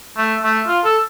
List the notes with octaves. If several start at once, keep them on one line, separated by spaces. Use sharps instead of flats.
A3
A3
F4
A4